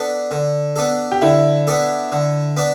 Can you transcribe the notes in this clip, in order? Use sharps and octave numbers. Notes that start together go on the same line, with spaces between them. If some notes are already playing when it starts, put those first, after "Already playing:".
Already playing: B3 D4 A4
D3
B3 D4 A4
G4
D3 E4
B3 D4 A4
D3
B3 D4